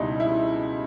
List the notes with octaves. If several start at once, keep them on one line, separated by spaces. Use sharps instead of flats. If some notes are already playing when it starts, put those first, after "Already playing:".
Already playing: C#2 B2 G3 D#4 E4
E4